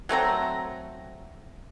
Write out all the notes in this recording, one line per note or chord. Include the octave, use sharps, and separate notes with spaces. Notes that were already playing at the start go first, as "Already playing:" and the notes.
F#3 A3 C4 A#5